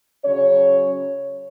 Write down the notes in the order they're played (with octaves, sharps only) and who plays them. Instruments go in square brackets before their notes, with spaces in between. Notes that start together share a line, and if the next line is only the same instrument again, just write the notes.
[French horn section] C#3 F#3 C#4 C#5